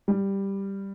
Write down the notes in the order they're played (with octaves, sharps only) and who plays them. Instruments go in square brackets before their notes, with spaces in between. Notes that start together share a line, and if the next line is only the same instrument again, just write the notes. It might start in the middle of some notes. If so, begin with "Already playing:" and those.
[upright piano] G3